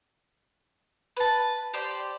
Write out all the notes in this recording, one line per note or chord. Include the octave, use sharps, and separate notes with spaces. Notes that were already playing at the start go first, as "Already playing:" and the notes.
B4 A5
G4 C5 D5 C6